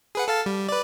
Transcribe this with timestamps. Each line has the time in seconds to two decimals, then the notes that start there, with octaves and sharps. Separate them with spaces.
0.15 G#4 B4 F#5
0.28 A4 F5 A5
0.46 G3
0.69 B4 D5